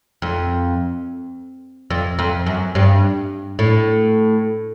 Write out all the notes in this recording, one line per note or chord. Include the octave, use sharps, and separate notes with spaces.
F2
F2
F2
F#2
G2
A2